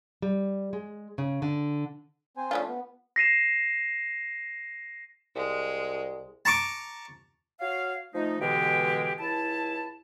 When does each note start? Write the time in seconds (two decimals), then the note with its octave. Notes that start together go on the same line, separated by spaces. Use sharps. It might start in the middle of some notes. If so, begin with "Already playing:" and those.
0.22 G3
0.73 G#3
1.18 C#3
1.42 D3
2.37 C4 C5 G#5
2.51 F3 A3 C#4 D4 F4
2.68 B3
3.16 A#6 C7 D#7 E7
5.35 C2 G#3
6.45 A5 A#5 C#6 D6
7.60 F#4 C#5 F5
8.13 F3 A3 D#4
8.39 B2 D3 E3 G#3 G4
9.19 C#2 E4 A5